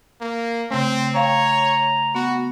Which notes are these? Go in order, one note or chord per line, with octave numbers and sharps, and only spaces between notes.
A#3
C#3 A3 C4
C#5 F5 G5 A#5
B3 F#4